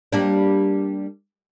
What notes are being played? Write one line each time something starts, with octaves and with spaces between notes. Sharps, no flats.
G3 A#3 D4